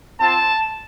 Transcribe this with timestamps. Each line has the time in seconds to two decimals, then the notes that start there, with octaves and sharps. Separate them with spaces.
0.20 C4 F4 A5